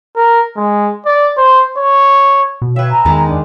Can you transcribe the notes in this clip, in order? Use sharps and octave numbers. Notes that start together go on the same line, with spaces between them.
A#4
G#3
D5
C5
C#5
B2
B4 C#5 E5 F5 G5
G#5 A#5
E2 D#3 G#3
D4